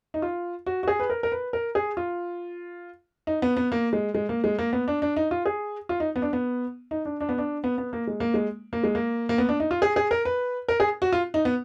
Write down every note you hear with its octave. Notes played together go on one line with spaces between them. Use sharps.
D#4
F4
F#4
F#4
G#4
B4
A#4
A#4
B4
A#4
G#4
F4
D#4
B3
B3
A#3
G#3
G#3
A#3
G#3
A#3
B3
D4
D4
D#4
F4
G#4
F4
D#4
B3
D4
B3
D#4
D4
D4
B3
D4
B3
B3
A#3
G#3
A#3
G#3
A#3
G#3
A#3
A#3
B3
D4
D#4
F4
G#4
G#4
A#4
B4
A#4
G#4
F#4
F4
D#4
B3